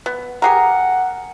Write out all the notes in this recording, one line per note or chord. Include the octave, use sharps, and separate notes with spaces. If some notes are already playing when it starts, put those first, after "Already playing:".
B3
G4 G#4 A#4 F#5